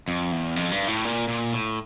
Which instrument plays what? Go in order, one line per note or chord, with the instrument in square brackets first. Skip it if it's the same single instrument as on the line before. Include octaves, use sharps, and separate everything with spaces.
[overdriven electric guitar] F2
E2
F2
G2
A2
A#2
A#2
A2